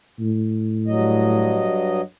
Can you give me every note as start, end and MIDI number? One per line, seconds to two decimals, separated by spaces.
0.20 1.69 45
0.87 2.01 43
0.87 2.01 54
0.87 2.01 75